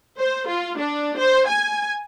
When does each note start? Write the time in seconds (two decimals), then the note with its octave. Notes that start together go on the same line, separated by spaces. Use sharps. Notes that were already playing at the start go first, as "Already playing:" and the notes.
0.19 C5
0.48 F4
0.78 D4
1.19 C5
1.48 G#5